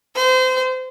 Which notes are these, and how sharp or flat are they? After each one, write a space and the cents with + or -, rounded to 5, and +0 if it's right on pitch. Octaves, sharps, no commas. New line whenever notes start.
C5 -30